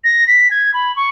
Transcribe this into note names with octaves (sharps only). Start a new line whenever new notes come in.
A#6
B6
G#6
B5
C#6